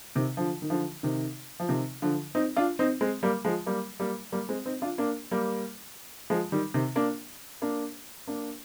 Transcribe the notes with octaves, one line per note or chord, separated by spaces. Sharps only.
C3 D#3
D3 F3
D#3
D3 F3
C3 D#3
F3
C3 D#3
D3 F3
C4 D#4
D4 F4
C4 D#4
G#3 C4
G3 A#3
F3 G#3
G3 A#3
G3 A#3
G3 A#3
G#3 C4
C4 D#4
D4 F4
A#3 D4
G3 A#3
F3 G#3
D#3 G3
C3 D#3
A#3 D4
A#3 D4
A#3 D4